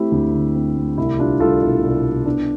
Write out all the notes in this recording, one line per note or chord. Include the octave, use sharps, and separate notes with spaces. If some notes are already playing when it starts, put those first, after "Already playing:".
Already playing: A3 C4 E4 G4
D2
D3
C4
A3
C2 E4
G3 D4 F4
C2 F4 A4
B2 E4
C2
G3
B3 D4